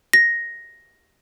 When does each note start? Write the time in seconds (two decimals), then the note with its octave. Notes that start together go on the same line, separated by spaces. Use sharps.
0.13 A#6